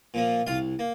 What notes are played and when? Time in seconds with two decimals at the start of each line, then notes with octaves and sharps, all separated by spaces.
0.14 A#2 F3 A#3
0.47 C2 F4 F5
0.79 A#3